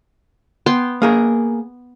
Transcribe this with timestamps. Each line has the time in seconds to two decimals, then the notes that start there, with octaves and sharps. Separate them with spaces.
0.66 B3 G5 C6
1.02 A#3 G#4 A#4